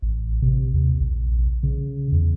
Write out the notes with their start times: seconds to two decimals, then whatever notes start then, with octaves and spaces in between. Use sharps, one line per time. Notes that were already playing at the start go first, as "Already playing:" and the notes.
0.02 A1
0.42 C3
0.73 D#2
1.00 A#1
1.63 C#3
2.12 E2